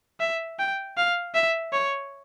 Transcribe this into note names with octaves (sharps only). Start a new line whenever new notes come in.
E5
G5
F5
E5
C#5